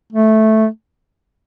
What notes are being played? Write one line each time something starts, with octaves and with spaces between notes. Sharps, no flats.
A3